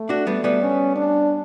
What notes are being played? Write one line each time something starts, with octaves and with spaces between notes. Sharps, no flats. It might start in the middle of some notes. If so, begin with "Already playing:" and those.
Already playing: A3
D4 F#4
G3 B3
G3 B3
C#4
D4